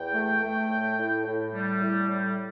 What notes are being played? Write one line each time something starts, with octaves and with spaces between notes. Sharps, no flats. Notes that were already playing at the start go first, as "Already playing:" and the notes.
Already playing: E2 G5
A3
A3
A2
A2
A2
G3
A2
G3